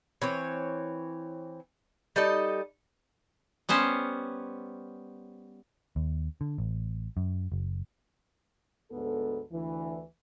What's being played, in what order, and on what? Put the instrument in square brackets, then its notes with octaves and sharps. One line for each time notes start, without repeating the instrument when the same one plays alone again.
[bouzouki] E3 C4 C#5
G3 D#4 A4 D#5
[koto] G3 B3 C#4 C5
[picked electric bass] D#2
D3
A1
F#2
F#1
[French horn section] D2 G#2 B3 A4
D2 E3